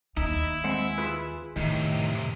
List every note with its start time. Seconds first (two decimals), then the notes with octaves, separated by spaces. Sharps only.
0.17 D#2 D#4 E4
0.64 G#3 C4 F#5
0.98 F4 G#4 B4
1.56 A2 C3 D#3 E4